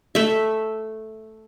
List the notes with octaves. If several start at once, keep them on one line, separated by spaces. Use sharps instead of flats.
A3 E5